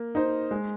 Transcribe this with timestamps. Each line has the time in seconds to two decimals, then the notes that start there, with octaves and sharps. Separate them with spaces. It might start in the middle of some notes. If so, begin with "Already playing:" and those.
Already playing: A#3
0.15 D#4 C5
0.51 G#3